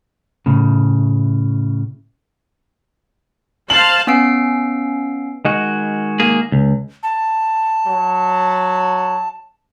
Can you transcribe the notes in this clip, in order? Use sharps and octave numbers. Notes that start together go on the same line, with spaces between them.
A2 C#3
C5 F5 A5 F#7
B3 C#4 F5 E6 C7 D7
D#3 G#3 F#4
A#3 G#4
C#2
A5
F#3